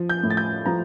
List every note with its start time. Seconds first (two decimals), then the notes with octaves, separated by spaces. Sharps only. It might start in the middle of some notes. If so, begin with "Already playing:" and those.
Already playing: F3
0.10 G6
0.23 A2
0.30 A6
0.37 G6
0.66 F3 A#5